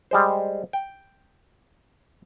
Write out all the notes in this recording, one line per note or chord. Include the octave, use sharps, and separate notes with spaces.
G3 G#3 C5
G5